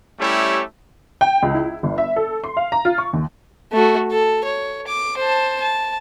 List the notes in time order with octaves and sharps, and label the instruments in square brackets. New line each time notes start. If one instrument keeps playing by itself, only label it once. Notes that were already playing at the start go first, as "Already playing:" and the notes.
[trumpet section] G3 A3 C#4 E4 G4 C#5
[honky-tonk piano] G5
C#2
E4
G1
E5
A4
C6
F5
A#5
F4
C#6
D#2
[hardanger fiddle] A3 F#4
A4
C#5
D6
C5 A5
A5